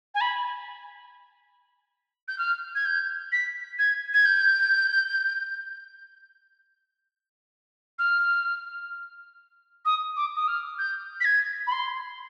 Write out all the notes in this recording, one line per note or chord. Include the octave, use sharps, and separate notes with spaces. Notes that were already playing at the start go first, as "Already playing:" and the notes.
G#5
B5
G6
F6
G#6
G6
B6
G#6
G#6
G6
F6
D#6
D6
D#6
F6
G6
B6
G#6
B5
C6